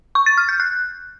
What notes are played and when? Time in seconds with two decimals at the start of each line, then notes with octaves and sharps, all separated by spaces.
0.15 C#6
0.26 A6
0.37 F6
0.49 G6
0.60 F#6